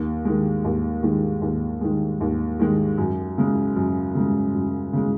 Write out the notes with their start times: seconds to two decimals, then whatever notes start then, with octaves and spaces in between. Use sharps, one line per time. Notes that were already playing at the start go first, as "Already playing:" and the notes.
Already playing: D#2
0.25 D#3 G#3
0.65 D#2
1.03 D#3 G#3
1.42 D#2
1.81 D#3 G#3
2.21 D#2
2.59 D#3 G#3
2.98 F#2
3.38 C#3 G#3
3.76 F#2
4.15 C#3 G#3
4.54 F#2
4.93 C#3 G#3